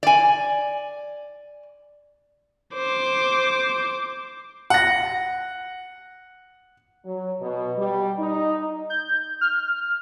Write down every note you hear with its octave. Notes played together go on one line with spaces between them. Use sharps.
D5 G#5
C5 D6
F#5 A#6
F#3
B2
G3
D#4
G6
F6